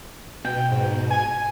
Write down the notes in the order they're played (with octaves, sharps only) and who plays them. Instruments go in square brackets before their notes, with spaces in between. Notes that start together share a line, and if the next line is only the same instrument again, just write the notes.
[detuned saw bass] B2 [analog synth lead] G5
[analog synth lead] G#2
G#5